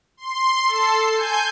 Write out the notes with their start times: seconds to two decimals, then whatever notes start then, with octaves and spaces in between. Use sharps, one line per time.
0.17 C6
0.66 A4 C7
1.14 G#5 G6